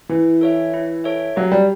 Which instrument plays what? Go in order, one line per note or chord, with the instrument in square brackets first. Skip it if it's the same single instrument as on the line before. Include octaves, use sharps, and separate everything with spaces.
[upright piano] E3 [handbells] E4
[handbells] A4 C#5 E5
E4
A4 C#5 E5
[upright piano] F#3 [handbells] G4
[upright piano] G3